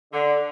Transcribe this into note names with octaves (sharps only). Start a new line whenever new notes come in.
D3